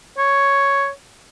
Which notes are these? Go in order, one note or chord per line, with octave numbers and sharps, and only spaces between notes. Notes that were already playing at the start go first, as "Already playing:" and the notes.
C#5